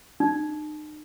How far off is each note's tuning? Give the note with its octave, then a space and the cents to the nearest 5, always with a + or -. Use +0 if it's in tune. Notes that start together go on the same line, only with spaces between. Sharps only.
D#4 -40